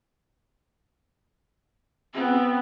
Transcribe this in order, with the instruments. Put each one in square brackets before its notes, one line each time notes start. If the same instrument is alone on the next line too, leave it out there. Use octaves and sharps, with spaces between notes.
[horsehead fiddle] B3 [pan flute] C4